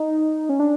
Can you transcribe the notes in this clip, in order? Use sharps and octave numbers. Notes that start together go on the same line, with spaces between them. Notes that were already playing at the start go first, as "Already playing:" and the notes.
Already playing: D#4
C#4
D4